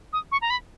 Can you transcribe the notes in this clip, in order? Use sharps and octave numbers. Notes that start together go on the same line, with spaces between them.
D#6
C#6
A#5
B5